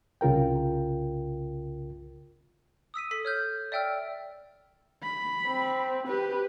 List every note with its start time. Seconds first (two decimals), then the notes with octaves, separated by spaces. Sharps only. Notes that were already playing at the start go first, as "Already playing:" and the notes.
0.21 C2 C#3 F4 A#4 G5
2.94 D#6 E6 B6 D#7
3.11 A4 B6
3.25 C#5 F6 G6
3.72 D5 E5 G5 E6 F6
5.03 B5
5.47 C4
6.08 G4 B4